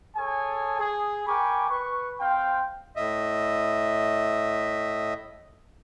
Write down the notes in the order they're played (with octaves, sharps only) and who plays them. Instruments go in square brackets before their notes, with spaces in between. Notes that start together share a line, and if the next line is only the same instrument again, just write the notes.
[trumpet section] G#4 A4 C#5 G#5
G#4
A#4 G5 G#5 B5 C#6 D6
B4 C#6
C4 C5 F5 G5
[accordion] A2 D#5 E5